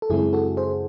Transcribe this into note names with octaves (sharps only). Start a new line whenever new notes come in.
A4
F#2 C#3 G#3 C4 E4 G#4
F#4 A4
G#4 C5